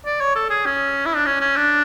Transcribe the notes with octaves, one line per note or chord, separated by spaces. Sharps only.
D5
C#5
A4
G#4
C#4
E4
D4
C#4
C#4
D4